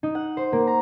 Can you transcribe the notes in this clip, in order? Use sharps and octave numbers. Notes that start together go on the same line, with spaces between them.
D#4
F#5
C5
A#3
A#5